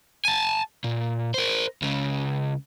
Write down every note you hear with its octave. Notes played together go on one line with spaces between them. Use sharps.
G#5 A5
A#2
A#4 C5
C#2 C#3